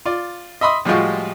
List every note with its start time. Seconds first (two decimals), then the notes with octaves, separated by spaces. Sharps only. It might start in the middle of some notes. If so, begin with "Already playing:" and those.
0.06 F4 D5
0.61 D#5 E5 B5 C6 D#6
0.85 A2 F3 G3 G#3 F4 F#4